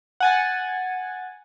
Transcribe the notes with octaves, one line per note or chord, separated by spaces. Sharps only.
F#5 G#5 A6